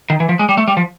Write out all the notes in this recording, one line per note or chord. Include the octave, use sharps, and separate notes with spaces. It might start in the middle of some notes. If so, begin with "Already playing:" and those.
D#3
E3
F3
G#3
G3
A3
G3
F3